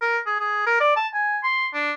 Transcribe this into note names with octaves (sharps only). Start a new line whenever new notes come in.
A#4
G#4
G#4
A#4
D5
A5
G#5
C6
D4